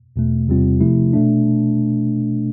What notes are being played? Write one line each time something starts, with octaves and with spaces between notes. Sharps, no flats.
E2 B2 A3
E2 C3 G3 C4 F4
C3 F3 A3 E4
B2 A3 D4